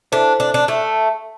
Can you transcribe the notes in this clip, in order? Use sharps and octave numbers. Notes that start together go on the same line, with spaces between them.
D4 E4 A4 C5 E5
D4
D4
A3